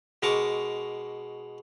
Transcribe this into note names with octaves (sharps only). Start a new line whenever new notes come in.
B2 G#3 A#4 A#5 C#6 D6